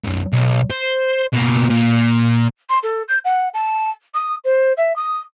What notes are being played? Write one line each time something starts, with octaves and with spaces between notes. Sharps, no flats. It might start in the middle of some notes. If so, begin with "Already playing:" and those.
B1 F#2
B1
C5
B2 A#3
A#2
C6
A4
G6
F#5
A5
D#6
C5
E5
D#6